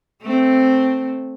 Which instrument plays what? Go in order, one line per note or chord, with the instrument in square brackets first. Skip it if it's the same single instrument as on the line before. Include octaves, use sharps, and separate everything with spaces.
[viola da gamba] A3 C4